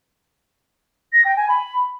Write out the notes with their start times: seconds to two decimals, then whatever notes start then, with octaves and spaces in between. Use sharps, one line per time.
1.13 A#6
1.25 G5
1.37 G#5
1.49 B5